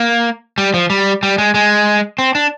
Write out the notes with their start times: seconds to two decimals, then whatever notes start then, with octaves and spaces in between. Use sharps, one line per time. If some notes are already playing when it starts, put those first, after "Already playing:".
Already playing: A#3
0.58 G3
0.74 F3
0.90 G3
1.23 G3
1.38 G#3
1.54 G#3
2.18 C4
2.35 D4